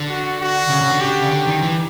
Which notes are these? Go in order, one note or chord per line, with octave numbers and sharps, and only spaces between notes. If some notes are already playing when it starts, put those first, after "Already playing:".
Already playing: D3
F#4
F#4
C#3
C#3
D3
G4
C#3
D3
D#3
E3